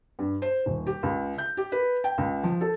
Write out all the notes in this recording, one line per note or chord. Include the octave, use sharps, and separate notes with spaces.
G2
C5
D#1
G4
C#2
G6
G4
B4
G5
C#2
F3
A4